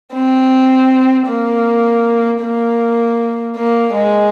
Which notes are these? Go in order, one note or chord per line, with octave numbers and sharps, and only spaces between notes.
C4
A#3
A#3
A#3
G#3